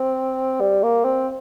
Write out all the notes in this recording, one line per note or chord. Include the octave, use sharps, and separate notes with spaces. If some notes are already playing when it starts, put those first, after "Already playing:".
Already playing: C4
G3
A#3
C4